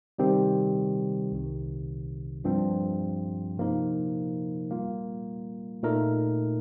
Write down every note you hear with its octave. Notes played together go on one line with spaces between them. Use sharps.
C3 D#3 G3 C4 G4
C2 C3 D#3
G2 F3 C4
C3 F3 A#3 D#4 A#4
G3 A#3 F4
A#2 A3 D#4 A#4